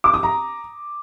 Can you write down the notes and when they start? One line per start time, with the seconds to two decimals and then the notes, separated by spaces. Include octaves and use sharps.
0.04 D6
0.14 D#6
0.23 A#5